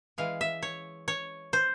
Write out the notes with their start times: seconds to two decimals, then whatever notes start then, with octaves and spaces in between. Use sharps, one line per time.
0.18 E3 G#3 F5
0.41 E5
0.62 C#5
1.08 C#5
1.53 C5